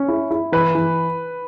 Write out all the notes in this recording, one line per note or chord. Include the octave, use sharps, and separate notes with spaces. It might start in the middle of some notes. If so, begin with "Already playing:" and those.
Already playing: C#4
E4
E4
E3 B4
E3